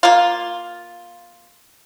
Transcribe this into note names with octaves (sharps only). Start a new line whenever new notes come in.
A#3 F4